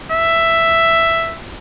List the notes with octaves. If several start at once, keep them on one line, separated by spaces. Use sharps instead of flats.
E5